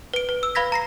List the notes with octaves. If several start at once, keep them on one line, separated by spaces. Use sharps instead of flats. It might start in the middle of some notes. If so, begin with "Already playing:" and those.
B4 D7
B4
E6
B4 F5 B5 G#6 A#6 B6
A#5 A#6 C7